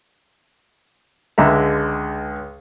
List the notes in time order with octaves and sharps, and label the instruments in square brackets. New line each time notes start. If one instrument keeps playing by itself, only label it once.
[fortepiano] C#2 D3 G#3 E5 A#5